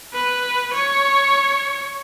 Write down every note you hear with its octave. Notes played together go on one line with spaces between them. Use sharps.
B4
C#5